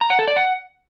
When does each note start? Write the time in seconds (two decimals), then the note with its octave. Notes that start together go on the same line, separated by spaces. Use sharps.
0.01 A#5
0.10 F#5
0.19 A4
0.28 D5
0.36 F#5